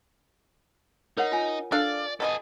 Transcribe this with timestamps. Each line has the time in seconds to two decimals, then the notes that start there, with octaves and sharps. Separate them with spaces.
1.17 D#4 A#4 C#5 F#5
1.32 F4 G#5
1.72 D4 A4 D5 F5
2.20 B2 E4 A4 D#5 G#5